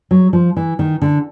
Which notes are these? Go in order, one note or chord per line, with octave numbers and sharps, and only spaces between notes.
F#3
F3
E3
D#3
D3